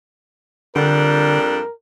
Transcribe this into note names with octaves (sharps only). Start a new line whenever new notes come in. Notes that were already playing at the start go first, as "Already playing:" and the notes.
F2 D3 G3 D4 A#4